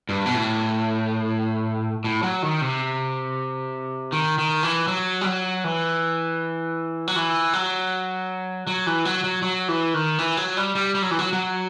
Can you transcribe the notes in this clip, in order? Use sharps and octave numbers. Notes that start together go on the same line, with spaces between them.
G2
B2
A2
A2
F#3
D#3
C3
D#3
D#3
E3
F#3
G3
F#3
E3
F#3
E3
F#3
F#3
E3
F#3
F#3
F#3
E3
D#3
E3
F#3
G3
G3
G3
F#3
E3
F#3
F#3